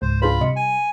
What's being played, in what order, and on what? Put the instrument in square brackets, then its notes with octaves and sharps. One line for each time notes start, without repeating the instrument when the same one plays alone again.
[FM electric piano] C#2 G#2 [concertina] C5
[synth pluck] D4 G#4 B4 [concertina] F4 B5
[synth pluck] C3 D#5 C#7 [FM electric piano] G3
[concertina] G#5